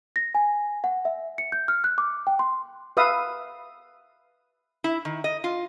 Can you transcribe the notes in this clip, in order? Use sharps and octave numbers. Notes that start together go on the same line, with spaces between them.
A#6
G#5
F#5
E5
C#7
G6
F6
F#6
D6
G5
C6
B4 E5 F5 D#6
E4
D#3
D#5
F4